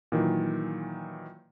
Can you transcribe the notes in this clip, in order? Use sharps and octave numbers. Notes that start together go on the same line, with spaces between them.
A#2 D#3 E3 F#3